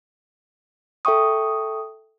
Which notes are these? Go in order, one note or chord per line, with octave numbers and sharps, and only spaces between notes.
A4 E5 G5 C#6 D#6